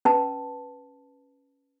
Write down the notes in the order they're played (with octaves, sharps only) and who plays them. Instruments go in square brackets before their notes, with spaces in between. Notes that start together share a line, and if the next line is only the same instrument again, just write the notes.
[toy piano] C#4 B4 A5